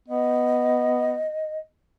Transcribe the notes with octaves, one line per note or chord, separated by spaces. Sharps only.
B3 D#5